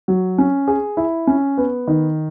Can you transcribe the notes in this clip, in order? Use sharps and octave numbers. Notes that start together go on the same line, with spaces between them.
F#3
C#4
G#4
E4
C#4
B3
D#3